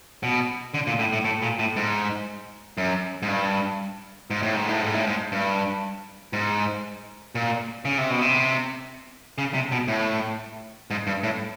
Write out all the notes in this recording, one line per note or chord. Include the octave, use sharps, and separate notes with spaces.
B2
D3
A#2
A2
A2
A2
A#2
A2
G#2
F#2
G#2
G2
G#2
A2
G#2
A2
G#2
A2
G#2
G2
G#2
A#2
C#3
C3
B2
C3
C#3
C3
B2
A2
G#2
G2
A2